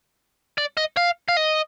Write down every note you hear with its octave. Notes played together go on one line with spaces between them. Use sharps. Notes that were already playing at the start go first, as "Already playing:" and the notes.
D5
D#5
F5
F5
D#5